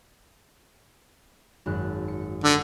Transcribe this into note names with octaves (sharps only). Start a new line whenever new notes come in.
G#1 F#2 F#6
C#7
D3